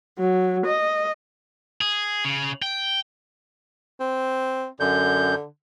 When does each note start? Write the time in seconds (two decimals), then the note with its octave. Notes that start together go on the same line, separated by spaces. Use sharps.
0.19 F#3
0.65 D#5
1.81 G#4
2.25 C#3
2.62 G5
4.00 C4
4.80 F#2 D3 G6